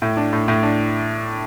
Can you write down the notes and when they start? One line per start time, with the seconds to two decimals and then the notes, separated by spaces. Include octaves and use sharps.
0.02 A2
0.17 D4
0.33 A2
0.48 A2
0.63 D4